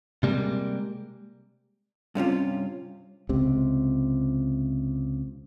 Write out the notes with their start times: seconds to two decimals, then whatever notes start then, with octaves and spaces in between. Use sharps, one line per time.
0.23 C3 G3 G#3 A#3
2.15 G2 C3 C#4 F4
3.29 C#2 C3